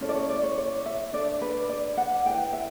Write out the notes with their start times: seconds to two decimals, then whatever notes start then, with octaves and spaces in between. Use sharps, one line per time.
0.01 C#4 E4 A4 C#5
0.09 D5
0.15 C#5
0.30 D5
0.44 C#5
0.58 C#5
0.86 E5
1.13 D4 A4 D5
1.42 B4
1.69 D5
1.97 F#5
2.25 E4 B4 G5
2.53 E5